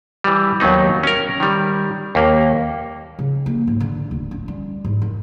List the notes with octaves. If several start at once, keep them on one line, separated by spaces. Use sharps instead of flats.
E3 G3
D#2 F#3 B3 D#4
C#4 A#4
D#3 G3
D#2 A#3
C#3
A#3
G#2
D3
D1
C#4
G3
G#2
D#3